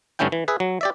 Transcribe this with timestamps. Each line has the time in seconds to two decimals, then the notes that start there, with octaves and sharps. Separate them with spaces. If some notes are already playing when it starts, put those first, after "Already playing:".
0.19 G2 D3 A3 C#4 E4 G5
0.32 E3
0.48 G#4 B4 E5
0.60 F#3
0.81 G4 D5 E5